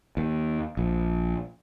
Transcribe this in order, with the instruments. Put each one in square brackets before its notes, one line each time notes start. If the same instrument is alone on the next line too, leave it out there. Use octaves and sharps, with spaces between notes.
[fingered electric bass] D#2
A#1